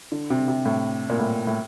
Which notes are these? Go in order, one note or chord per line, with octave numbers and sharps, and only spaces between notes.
D3
C3
C3
A2
A#2
A2
A2